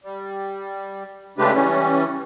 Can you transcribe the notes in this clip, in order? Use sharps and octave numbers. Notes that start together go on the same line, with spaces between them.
G3
C#3 G#3 A3 D4 G4 B4
E3 G3 C#4